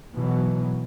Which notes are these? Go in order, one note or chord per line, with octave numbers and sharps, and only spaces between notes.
B2 E3 F#3